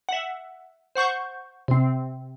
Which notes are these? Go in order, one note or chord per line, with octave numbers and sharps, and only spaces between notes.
E5 F#5
C5 F#5 C#6 G6
C3 C4